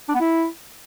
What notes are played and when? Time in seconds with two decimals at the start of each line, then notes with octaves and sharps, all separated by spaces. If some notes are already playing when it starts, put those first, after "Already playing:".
0.08 D4
0.14 B3
0.20 E4